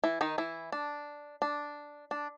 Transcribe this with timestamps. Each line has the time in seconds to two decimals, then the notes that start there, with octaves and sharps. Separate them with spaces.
0.04 E3 E4
0.21 D#3 D#4
0.38 E3 E4
0.72 D4
1.42 D4
2.11 D4